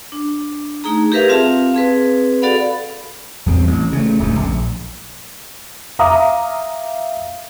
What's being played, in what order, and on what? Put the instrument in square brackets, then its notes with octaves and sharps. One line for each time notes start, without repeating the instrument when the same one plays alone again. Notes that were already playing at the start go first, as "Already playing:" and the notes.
[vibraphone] D4
A3 D#4 G#4 A#5
G4 G#4 A#4 B4 E5 F5
C4 F4 F5 A5
C4 G#4 B4
F#4 A4 D5 F5 F#5 B5
[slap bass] E2 G3 C4
A1
C#3 A3
D1 C#2 G2 A3
A#1
[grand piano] E5 F5 A#5 D6 D#6